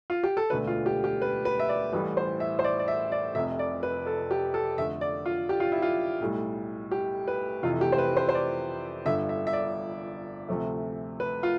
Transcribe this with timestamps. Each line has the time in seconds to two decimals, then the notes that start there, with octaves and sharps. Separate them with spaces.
0.10 F4
0.23 G4
0.37 A4
0.50 E1 D2 D3 A3 B4
0.67 F4
0.86 G4
1.04 G4
1.22 B4
1.45 B4
1.59 E5
1.69 D5
1.92 A1 A2 E3 G3 B4
2.17 C5
2.40 E5
2.59 C5
2.64 D5
2.79 D5
2.88 E5
3.12 D5
3.35 F1 F2 C3 E5
3.59 D5
3.83 B4
4.07 A4
4.31 G4
4.54 A4
4.78 F2 D3 A3 E5
5.01 D5
5.26 F4
5.49 G4
5.60 F4
5.72 E4
5.82 F4
6.21 B1 A2 G3
6.91 G4
7.28 B4
7.63 F1 F2 C3 E3 A3 F4
7.81 G4
7.92 C5
7.98 B4
8.17 C5
8.29 C5
8.35 D5
9.06 G1 G2 D3 E5
9.29 E5
9.47 E5
9.53 D5
10.48 D2 C3 F3 A3
11.20 B4
11.43 F4